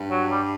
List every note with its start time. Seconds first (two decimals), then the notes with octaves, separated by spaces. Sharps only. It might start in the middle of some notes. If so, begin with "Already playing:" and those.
Already playing: G2
0.10 F#3
0.31 G3